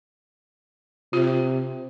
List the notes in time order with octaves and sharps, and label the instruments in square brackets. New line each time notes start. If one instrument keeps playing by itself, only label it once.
[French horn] C3 [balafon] F4